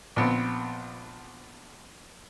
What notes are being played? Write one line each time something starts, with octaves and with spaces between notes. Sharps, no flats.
A#1 B3 C4